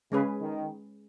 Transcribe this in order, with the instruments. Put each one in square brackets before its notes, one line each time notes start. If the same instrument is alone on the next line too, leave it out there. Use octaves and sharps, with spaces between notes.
[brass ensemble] C#3 [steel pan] G#3 C#4 G#4 B4
[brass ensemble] D#3